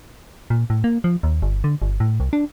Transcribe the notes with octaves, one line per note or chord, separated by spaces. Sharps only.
A#2
A2
A#3
F3
D#2
G1
D3
G1
A2
C2
D4